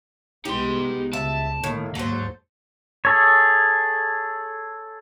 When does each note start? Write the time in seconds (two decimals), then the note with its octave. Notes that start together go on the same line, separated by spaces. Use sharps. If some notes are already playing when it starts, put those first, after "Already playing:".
0.45 C2 G#3 B3 D#4 G4 C6
1.13 C#2 E5 A5
1.64 A2 D#3 A3 A#3
1.95 D#2 G#2 F#3 A4 C5
3.05 G#4 A4 C#5